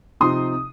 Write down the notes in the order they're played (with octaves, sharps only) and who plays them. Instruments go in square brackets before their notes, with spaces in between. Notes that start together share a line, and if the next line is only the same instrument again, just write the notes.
[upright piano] C3 F3 C4 D#4 C6 D#6